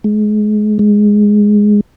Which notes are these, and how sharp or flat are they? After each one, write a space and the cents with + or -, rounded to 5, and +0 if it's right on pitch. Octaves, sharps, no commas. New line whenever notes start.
G#3 +30
G#3 +0